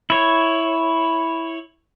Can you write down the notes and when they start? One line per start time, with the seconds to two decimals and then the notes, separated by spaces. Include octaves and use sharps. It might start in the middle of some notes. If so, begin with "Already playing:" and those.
0.10 E4 C#5